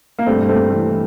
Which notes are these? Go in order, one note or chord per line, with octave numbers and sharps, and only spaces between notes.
A#3
G2 A3 C4
G2
A3 C4
G2
E3 A3
E3